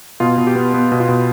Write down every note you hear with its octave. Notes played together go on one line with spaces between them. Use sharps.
B2 F4
B2
G4
B3
B3
B2
F4
B2